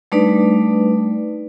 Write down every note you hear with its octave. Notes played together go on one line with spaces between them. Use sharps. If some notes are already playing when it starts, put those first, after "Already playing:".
G3 A3 D4 D#4 B4 D5